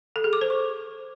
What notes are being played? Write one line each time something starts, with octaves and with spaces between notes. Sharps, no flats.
A4
G#4
D6
C5
C#6